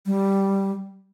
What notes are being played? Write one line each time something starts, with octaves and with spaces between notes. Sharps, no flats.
G3